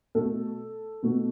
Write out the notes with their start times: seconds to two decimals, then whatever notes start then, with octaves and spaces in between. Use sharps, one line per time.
0.15 B2 A3 A4
1.03 B2 A3